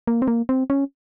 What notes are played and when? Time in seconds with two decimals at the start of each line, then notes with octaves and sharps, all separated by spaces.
0.07 A#3
0.22 C4
0.28 A#3
0.49 C4
0.70 C#4